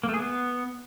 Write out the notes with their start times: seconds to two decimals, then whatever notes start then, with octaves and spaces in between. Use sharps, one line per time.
0.03 A#3
0.09 A3
0.14 G#4
0.19 B3